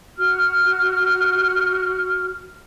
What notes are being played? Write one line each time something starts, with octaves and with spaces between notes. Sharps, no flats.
F#4 F6